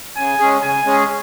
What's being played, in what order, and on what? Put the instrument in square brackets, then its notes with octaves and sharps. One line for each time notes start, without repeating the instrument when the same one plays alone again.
[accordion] C#3 [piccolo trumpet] G#5
[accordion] G#3 C#4 G#4
[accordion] C#3 [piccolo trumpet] G#5
[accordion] G#3 C#4 G#4